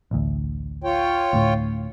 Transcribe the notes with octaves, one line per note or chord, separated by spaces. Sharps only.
A1 D2
F4 C#5 G5
D2 A2